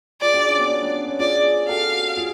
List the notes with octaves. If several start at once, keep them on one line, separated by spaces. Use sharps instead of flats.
F4 G#4 D5
D4 F#4
C#4 F4
B3 D4
C#4
B3 D4
C#4
F4 G#4 D5
F#4 A4 F5
F4 G#4